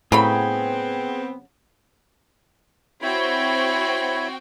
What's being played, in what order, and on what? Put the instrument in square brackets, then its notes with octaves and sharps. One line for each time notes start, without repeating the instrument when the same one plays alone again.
[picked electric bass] A2 [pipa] C#3 F#3 B5 [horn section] B3 C4 [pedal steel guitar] G#4 G5
[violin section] C4 F#4 G5 [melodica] E4 C#5 B5